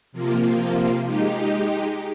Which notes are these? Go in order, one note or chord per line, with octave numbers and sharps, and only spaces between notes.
C3 F3 A#3 F4
G#3 D#4 G4